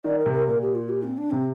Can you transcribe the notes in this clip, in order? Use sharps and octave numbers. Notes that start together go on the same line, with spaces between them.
D#3 D5
A#4
C3
A#4
A#2 A#4
G4
F4
G4
C4
D4
C3 C4